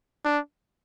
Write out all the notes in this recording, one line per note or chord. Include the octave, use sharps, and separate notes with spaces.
D4